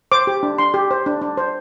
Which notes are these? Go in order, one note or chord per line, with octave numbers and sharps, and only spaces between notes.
C5 D6
G4
D4
D4 C6
G4
C5
D4
D4
C5